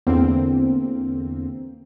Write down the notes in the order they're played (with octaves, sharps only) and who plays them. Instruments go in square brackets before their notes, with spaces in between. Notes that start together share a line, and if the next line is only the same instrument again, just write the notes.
[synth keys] E2 D3 A#3 C4